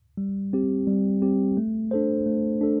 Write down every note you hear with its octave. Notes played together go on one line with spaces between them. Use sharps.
G3
C4 G4
G3
C4 G4
A3
D4 A4 C5
A3
D4 A4